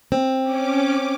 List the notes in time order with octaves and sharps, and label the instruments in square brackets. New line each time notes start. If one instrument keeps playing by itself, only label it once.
[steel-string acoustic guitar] C4
[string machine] C#4 D6